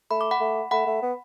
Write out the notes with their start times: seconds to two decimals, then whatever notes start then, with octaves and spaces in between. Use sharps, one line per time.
0.11 A3 B5
0.21 D6
0.31 F#5 B5
0.40 A3
0.71 A3 F#5 B5
0.87 A3
1.02 B3